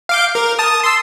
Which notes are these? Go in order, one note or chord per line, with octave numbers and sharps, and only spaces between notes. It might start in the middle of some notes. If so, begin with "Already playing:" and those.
F5 D6 G6
A#4
A5 D#6
C6 E6